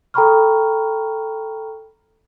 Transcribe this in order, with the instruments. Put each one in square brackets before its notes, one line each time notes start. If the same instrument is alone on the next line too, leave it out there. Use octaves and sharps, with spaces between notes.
[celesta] A4 G5 A#5 B5 C#6 F6